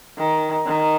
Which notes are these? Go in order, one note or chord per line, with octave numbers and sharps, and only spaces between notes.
D#3
D#3